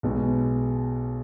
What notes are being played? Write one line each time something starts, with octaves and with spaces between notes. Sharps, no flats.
B1 B2 G#3